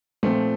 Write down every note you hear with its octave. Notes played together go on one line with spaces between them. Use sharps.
A#2 F3 A3 C4